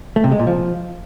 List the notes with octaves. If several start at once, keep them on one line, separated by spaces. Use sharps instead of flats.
A3
C3
G#3
A#2
F3